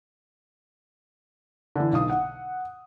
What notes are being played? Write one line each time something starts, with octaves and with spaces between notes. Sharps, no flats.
D3 E3
B1 F5 D#6
F#5